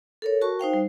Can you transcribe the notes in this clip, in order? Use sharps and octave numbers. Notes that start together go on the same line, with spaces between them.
A4 A#4 C#5
F#4 A#4 A5 C#6
D#4 C5 F5 G5
G3